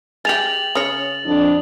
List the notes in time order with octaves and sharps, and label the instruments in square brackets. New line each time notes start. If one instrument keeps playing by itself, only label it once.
[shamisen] G#3 G4 [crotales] A6 F7 F#7
[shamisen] C#3 C#5 [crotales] D#6
[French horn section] F2 D4